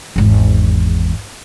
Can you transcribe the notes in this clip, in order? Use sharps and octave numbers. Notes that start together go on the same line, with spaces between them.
G#1 E2